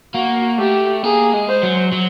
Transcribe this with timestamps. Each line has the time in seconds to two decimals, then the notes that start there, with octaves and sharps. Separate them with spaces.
0.15 A#3 F#4
0.59 A3 G4
1.04 A#3 G#4
1.34 G#3
1.48 C5
1.63 F#3
1.92 F#3